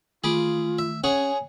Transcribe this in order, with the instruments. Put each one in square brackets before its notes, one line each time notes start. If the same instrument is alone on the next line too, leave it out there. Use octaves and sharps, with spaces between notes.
[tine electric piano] D#3 A3 [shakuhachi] F4 [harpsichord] G#4 B5 D6
[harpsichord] E5
[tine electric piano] C#4 [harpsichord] G#4 C#5 F#5 [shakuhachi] G#5